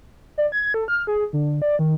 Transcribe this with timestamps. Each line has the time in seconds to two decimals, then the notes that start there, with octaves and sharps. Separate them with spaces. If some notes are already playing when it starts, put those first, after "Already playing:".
0.38 D5
0.52 G#6
0.74 A4
0.88 F6
1.07 G#4
1.33 D3
1.62 D5
1.79 D#3